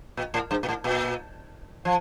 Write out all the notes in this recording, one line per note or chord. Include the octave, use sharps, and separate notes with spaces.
A#2
A2
G2
A#2
A2
A#2
F3